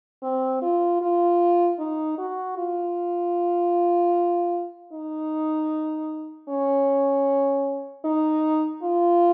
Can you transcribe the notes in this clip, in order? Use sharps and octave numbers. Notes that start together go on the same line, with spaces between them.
C4
F4
F4
D#4
F#4
F4
D#4
C#4
D#4
F4